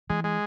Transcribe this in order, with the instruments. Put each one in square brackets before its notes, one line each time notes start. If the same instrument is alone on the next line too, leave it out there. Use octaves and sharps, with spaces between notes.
[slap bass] E3 [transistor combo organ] G#3
[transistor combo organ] G#3